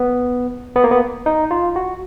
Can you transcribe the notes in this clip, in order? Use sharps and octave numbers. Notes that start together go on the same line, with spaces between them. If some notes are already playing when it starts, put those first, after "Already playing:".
Already playing: B3
B3
A#3
B3
D#4
F4
F#4